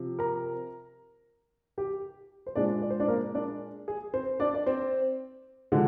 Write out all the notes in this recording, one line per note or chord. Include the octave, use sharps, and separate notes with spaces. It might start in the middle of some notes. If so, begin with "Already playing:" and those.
Already playing: C3 F3
A#4 A#5
G4 G5
C5
A#2 G#3 D4 D5
D5
C5
D4 D5
A#3 A#4
D4 D5
G#4
C4 C5
D4 D5
D5
C4 C5
D3 F3 G#3